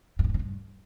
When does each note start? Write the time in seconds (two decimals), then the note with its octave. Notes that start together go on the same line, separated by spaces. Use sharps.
0.19 G2
0.24 A2
0.29 B2
0.34 C#3
0.39 G2